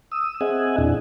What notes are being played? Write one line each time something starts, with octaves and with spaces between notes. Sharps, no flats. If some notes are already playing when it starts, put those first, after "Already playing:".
D#6 E6
C4 G#4 D#5 E5 F#5 G#5
E2 A#2 D4 E4